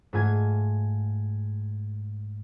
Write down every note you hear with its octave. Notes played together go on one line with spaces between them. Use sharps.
G#2 A3 F4 G#5 G#6